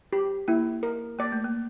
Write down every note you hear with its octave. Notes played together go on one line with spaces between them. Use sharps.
G4
A#3 E4
A#4
A#3 D5
A3
A#3